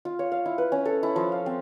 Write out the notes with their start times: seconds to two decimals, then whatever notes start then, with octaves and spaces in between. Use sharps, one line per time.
0.05 F4
0.19 C#5
0.32 F5
0.46 E4
0.58 B4
0.72 C#4
0.85 A4
1.03 E4
1.16 F3
1.32 F5
1.46 C4